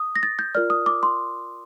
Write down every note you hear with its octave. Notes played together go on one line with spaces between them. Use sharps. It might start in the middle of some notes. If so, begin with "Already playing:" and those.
Already playing: D#6
A#6
A6
G6
F4 A#4 D5 F6
D#6
D6
C6